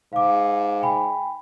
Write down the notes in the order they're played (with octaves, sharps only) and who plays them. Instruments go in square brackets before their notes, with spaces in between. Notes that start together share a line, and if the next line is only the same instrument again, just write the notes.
[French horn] G#2 [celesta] F5 D6
[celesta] G5 G#5 B5